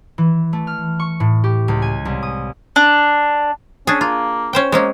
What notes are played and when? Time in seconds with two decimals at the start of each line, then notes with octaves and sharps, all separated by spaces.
0.18 E3
0.53 A3
0.67 F6
1.00 C#6
1.20 A2
1.44 G4
1.68 C#2
1.82 G#5
2.05 C2
2.23 D#6
2.76 D4
3.87 C#4 D4 G#4
4.01 A#3 F4
4.53 C#4 C5 G5
4.72 G#3 A#3 C4 C#4